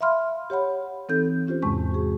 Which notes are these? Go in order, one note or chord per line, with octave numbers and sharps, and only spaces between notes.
E5 F5 B5 C6 F6
G4 C#5 F#5 B5
E3 C4 D#4 A4 G6
C#4 F4 G4 C5
E2 G#2 C3 G#3 A5 C#6
F#4 G#4